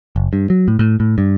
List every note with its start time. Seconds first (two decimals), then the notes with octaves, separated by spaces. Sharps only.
0.16 F#1
0.33 G2
0.50 F#3
0.68 A2
0.79 A2
1.00 A2
1.18 G2